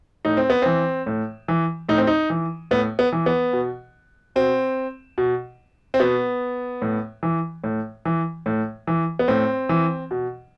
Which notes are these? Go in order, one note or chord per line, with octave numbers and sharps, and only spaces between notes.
A2 D#4
C4
B3
E3 C4
A2
E3
A2 D#4
C4
D#4
E3
A2 B3
B3
E3
B3
B2
B2 C4
B2
C4
B2 B3
A2
E3
A2
E3
A2
E3
B3
A2 C4
E3
B2